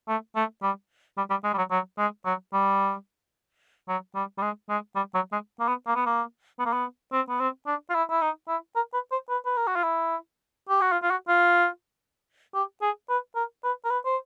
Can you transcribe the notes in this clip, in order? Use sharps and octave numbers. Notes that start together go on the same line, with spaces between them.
A3
A3
G3
G3
G3
G#3
G3
F#3
F#3
G#3
F#3
G3
F#3
G3
G3
G#3
G#3
G3
F#3
G#3
A#3
B3
A#3
B3
A#3
B3
A#3
B3
C4
B3
C4
D4
F4
E4
E4
D#4
E4
A#4
B4
C5
B4
B4
A#4
F#4
F4
E4
G4
F#4
F4
F4
F#4
F4
G4
G#4
B4
A#4
B4
A#4
B4
C5